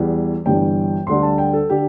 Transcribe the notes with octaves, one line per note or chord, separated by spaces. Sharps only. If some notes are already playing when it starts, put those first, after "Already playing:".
Already playing: E2 E3 G3
G1 G2 E3 G3 G5
D2 D3 G3 C6
A5
G5
A4
D3 G4